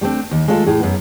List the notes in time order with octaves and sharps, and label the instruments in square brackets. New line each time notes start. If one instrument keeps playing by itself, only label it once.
[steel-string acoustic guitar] G3 A3 A#3 C4 D4
D#2
G#3 A3 F4 A4 E5 F5
A2 G#4
F#2 B3